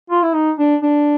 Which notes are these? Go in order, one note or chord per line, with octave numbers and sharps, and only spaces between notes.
F4
E4
D#4
D4
D4